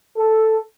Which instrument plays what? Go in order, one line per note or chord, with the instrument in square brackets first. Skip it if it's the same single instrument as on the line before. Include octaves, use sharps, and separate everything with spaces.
[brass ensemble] A4